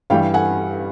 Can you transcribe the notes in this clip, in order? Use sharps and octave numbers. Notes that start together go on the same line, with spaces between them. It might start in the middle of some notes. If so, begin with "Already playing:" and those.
G2 E3 G3 F5 G5
F#5 G#5